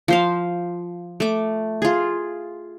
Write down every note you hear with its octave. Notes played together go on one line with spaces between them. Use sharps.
F3 C5 F5
A3 D6
F4 G#4